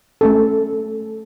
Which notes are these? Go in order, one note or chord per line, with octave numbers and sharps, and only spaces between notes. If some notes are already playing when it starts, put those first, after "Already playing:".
A3 C#4 A4